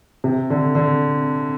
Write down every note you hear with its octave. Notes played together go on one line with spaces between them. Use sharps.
C3
D3
D3